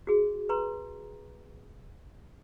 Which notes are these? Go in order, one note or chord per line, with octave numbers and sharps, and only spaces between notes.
F#4 G#4
B4 A#5 C6